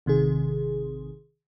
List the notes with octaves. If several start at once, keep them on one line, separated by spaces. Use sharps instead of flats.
A1 C3 D#3 G#4